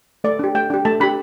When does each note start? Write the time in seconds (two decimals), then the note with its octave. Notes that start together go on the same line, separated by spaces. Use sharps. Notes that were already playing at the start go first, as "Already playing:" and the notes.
0.24 A3 D5
0.39 D4 G4
0.55 A3 G5
0.70 D4 G4
0.85 A3 A5
1.00 D4 G4 B5